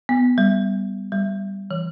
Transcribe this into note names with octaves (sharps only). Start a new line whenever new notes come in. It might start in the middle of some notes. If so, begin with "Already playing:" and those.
B3
G3
G3
E3